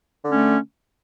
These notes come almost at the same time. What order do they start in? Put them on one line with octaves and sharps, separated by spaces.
D3 C#4 A3